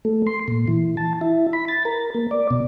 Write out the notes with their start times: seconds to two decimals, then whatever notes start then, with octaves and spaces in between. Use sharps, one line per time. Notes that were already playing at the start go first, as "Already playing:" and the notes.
0.05 A3
0.27 C6
0.48 A#2
0.68 E3
0.97 A5
1.21 E4
1.53 B5
1.68 A6
1.85 A#4
2.14 A#3
2.31 D5
2.50 B2